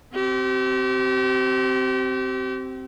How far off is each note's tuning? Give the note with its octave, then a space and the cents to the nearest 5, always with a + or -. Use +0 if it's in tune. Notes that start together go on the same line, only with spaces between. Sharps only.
C4 +0 G4 -35